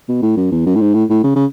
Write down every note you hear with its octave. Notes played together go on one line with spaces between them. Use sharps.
B2
A2
F#2
E2
F#2
A2
G#2
A2
A2
C#3
C#3